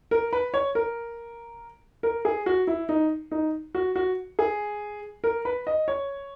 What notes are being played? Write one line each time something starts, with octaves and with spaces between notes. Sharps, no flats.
A#4
B4
C#5
A#4
A#4
G#4
F#4
E4
D#4
D#4
F#4
F#4
G#4
A#4
B4
D#5
C#5